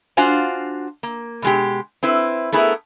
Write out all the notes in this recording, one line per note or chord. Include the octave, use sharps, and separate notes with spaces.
D4 F4 F#4 C5 F5 G#5
A#3
B2 G#3 G4
C4 E4 B4
A3 B3 E4 G#4 A#4